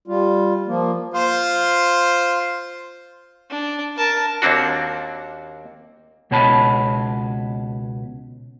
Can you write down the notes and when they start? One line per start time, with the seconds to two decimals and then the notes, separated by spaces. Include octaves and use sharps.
0.08 G3 F4
0.67 F3 A#3
1.14 F4 C5
3.50 D4
3.97 A#4 A5
4.42 D#2 A#3 C4 D4 F#4
6.31 C#2 B2 C#5 A5 B5